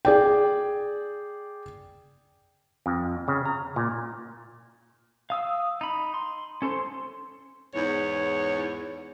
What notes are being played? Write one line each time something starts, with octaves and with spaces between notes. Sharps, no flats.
G#4 D5 G5
F2
C#3
A#5
A#2
F5 D#6 E6
D#4 B5
C6
C#4 A4 C5 C6
E2 G#2 C#5